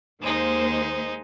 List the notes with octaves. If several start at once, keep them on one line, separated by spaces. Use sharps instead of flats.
D#2 G#3 A#3 D#4 C5